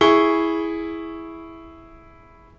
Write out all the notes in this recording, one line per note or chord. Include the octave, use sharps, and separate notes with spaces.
E4 G#4 C#6 G7